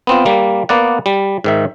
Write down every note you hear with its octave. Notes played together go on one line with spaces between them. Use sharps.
B3 C4 F4
G3 A#3
A#3 B3 D5 F#5
G3
G#2 D#3 E5